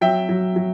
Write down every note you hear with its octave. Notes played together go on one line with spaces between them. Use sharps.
F#3 E5 G5
F#3
F#3